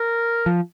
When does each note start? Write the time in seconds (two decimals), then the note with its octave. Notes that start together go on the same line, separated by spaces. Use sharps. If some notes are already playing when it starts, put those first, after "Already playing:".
Already playing: A#4
0.46 F3